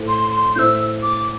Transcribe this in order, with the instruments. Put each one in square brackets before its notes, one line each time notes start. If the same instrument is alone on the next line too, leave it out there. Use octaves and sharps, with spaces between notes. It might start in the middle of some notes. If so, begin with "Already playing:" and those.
Already playing: [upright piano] A2 A3 E4 C5
[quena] C6
C6
[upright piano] A2 A3 E4 C5 [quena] E6 G6
[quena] D6